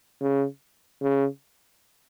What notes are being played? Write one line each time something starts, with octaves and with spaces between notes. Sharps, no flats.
C#3
C#3